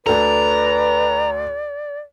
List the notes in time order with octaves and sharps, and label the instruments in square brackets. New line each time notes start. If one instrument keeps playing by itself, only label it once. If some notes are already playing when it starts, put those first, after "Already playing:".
[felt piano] D2 A4 [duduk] B4 [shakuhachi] D5 [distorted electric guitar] A#5